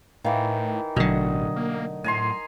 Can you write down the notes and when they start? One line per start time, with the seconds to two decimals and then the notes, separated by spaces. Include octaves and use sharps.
0.24 A2 D#3 E3 F5
0.96 A1 B2 D3 F#3 A3 D4 D#5
1.56 A#3
2.04 A2 G#5 A#5 C6